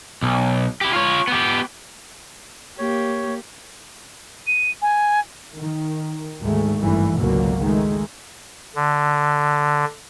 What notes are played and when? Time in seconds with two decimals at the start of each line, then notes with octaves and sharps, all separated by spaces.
0.23 B1
0.81 E4 G4
0.93 F4 C#5
1.28 B3 G4
2.78 A#3 G4 C#5
4.47 D#7
4.82 G#5
5.58 D#3
6.41 D2 G#2 D#3 G#3 A3
6.80 G#1 E2 G2 E3 A3
7.20 G#1 C#2 B2 D3 F#3 A#3
7.62 D#3 G#3 A3
8.75 D3